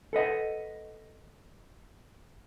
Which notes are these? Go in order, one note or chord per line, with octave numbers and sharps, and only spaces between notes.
A4 B4 D#5 F#5